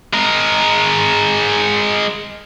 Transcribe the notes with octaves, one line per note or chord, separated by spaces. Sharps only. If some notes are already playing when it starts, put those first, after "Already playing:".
G#3 A#4